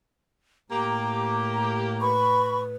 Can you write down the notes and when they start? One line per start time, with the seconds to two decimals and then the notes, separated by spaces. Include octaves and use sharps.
0.72 A2 A#3 G4 A#5
2.00 B4 B5 C#6